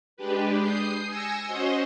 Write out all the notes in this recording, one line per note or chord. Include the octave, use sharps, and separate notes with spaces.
G#3 D4 G4 B4
D#6 G6 C7
G#5 E6 G#6 A#6 C#7
C#4 F#4 C5 D#5 C6